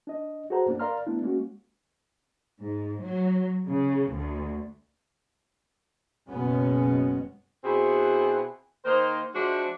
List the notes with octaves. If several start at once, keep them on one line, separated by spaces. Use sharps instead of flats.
D4 D#5
F#4 G#4 A4 C5 F#5 A#5
F#2 A#3 D4
A#4 D5 F5 A#5 C6 F6
A3 B3 D4 E4
G#3 A#3 C#4 F#4
G#2
F#3
C#3
D2
F#1 F#2 B2 G#3 B3 C#4
B2 C4 E4 F#4 G#4
D#3 A#3 D#4 A#4 C5
F3 G#3 D4 F#4 C5 E5